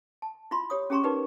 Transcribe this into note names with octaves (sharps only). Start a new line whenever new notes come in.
A5
E4 F4 B5 C6
G4 C#5 D#6
C#4 G4 G#4 A#5 C6 C#6
D#4 G4 A#4 B4 D5